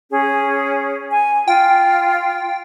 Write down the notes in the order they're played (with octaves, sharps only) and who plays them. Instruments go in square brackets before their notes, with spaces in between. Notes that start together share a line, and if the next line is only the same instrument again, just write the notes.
[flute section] C#4 G#4
G#5
[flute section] F4 [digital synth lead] G5